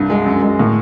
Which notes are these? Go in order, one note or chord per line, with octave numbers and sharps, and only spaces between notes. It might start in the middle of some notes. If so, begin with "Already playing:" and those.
Already playing: C2 G2
G#3
F#2
G#3
A2